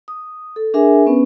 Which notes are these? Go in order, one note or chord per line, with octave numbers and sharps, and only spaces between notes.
D#6
A4
D4 G#4 A#4 E5 G#5
B3 C#4 B4